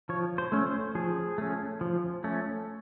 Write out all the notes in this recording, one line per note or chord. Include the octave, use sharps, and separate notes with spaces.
F3 C#5
C5
A3 C#4
C5
F3 G#4
A3 C#4
F3
A3 C#4